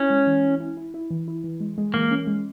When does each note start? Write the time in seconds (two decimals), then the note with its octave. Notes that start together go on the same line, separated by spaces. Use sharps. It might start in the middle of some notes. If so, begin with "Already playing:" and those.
Already playing: C#4 E4
0.10 G#3
0.27 E3
0.44 E4
0.60 E4
0.77 E4
0.94 E4
1.10 E3
1.28 E4
1.44 E3
1.60 G#3
1.78 G#3
1.94 E3 A#3
2.11 C#4
2.27 G#3